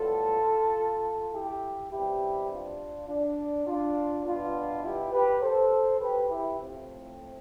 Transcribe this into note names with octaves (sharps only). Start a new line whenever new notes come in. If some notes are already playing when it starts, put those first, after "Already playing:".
Already playing: A2 G3 B3 F4 A4
E4 G4
B2 G3 C4 E4 G4
D4 F4
D4
D4 F4
B2 G3 B3 D4 F4
E4 G4
G4 B4
A4 C5
G4 B4
E4 G4
A2 F3 A3 C4